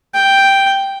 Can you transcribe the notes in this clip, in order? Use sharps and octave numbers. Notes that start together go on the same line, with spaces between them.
G5